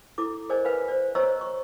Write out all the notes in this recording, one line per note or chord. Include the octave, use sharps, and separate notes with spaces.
E4 A4 D6
G#4 A#4 C5 D5 D#5 G#5
B4 F5 G#5 B5
C5 D5
C5 C#5 D#5 A#5 C#6 E6
C#6